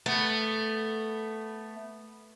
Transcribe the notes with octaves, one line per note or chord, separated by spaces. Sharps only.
A3 B3